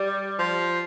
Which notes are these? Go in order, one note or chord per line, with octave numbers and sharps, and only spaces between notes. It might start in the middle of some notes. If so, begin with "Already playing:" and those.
Already playing: G3
F3